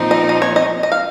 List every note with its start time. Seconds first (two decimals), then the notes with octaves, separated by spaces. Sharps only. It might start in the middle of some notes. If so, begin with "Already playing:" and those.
Already playing: A#2 F3 C4 D#4
0.11 D#5
0.29 D#5
0.42 C#5
0.56 D#5
0.83 D#5
0.92 F5